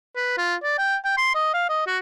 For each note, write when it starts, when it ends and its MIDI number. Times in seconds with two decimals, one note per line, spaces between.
0.16 0.33 71
0.38 0.55 65
0.63 0.77 74
0.78 0.96 79
1.05 1.15 79
1.18 1.34 84
1.35 1.53 75
1.54 1.68 77
1.69 1.83 75
1.87 1.98 66